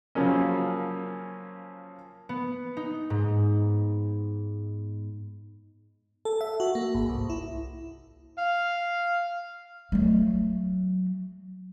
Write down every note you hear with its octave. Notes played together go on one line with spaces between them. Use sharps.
C#3 F3 F#3 A#3 C#4
B3
D#4
G#2
A4
E5
F#4
A#3
G#1
C2
E4
F5
F#3 A3